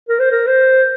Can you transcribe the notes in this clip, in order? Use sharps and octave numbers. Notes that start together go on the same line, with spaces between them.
A#4
C5
A#4
C5